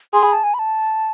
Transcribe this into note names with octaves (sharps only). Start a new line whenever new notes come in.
G#4 C6
B5
A5
G#5
B5
A5